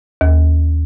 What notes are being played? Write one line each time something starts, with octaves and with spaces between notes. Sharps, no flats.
D#2